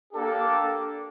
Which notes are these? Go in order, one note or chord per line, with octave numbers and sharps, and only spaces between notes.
A#3 D4 G4 A4